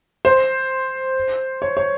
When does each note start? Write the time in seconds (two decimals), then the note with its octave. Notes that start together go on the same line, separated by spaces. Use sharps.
0.25 C5
1.62 C#5
1.77 C#5